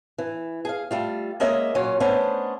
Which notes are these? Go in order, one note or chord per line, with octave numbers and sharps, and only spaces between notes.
E3
G#4 F5
G3 A3 F4
G#3 A#3 C#4 D#5 E5
A#2 F#3 C#4 F4
A3 B3 C#4 D4 C5